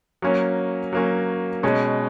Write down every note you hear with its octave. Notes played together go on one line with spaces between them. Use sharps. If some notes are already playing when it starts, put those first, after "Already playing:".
F#3 A#3 C#4
F#3 A#3 C#4
B2 G#3 C#4